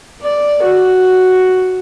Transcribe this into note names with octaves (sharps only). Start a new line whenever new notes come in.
D5
F#4